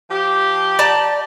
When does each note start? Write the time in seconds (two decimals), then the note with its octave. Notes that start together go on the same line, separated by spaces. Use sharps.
0.10 F3 G4
0.79 D5 A5 A#5